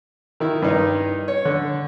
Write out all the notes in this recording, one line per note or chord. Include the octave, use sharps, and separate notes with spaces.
D#3 E4
G2 D#4
C#5
D3